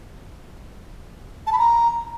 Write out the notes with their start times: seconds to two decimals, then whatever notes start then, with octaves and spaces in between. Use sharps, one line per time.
1.47 A5
1.53 B5
1.59 A#5